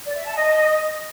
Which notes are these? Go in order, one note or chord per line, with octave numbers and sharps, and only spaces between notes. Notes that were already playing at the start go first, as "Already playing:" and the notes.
D5
E5
A5
D#5